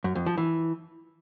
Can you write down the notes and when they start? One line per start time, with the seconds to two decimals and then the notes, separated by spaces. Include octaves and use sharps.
0.04 F#2
0.15 F2
0.26 F3
0.37 E3